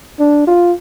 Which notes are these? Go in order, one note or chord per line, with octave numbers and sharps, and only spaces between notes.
D4
F4